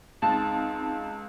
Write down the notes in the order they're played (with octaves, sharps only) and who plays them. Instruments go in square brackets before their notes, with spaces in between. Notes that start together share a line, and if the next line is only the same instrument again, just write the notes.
[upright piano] C#2 [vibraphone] C4 D#4 [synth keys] A5